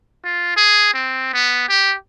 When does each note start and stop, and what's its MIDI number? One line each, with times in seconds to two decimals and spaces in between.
0.25 0.55 65
0.57 0.91 68
0.94 1.31 60
1.34 1.68 59
1.69 1.96 67